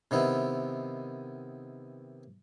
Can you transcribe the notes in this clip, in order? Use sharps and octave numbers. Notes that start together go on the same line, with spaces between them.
C3 D#3 B3 E4